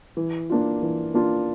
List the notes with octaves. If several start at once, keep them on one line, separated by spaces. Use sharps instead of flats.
E3
A#3 D4 F4
E3
A#3 D4 F4